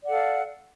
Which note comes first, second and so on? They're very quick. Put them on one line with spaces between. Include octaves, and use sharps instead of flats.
D5 F#5 A4 F5